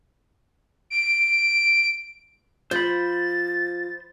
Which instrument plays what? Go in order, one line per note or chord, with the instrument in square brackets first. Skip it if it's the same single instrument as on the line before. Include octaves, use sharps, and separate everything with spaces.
[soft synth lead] D7
[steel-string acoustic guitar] F3 [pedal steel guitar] C5 B5 [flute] A6